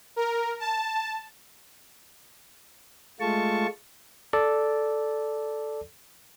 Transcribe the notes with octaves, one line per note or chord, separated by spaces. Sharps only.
A#4
A5
G#3 A3 F4 A5 C#6
A4 D5